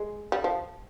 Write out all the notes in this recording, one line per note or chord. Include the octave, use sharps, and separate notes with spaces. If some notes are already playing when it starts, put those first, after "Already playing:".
Already playing: G#3
G3
F3